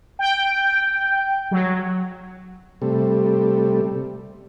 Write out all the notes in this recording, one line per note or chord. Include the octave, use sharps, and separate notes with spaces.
G5
F#3
C3 G3 A3